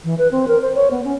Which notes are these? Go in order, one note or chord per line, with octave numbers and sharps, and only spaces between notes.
E3
B4
C4
A#4
C5
C#5
B3
C#4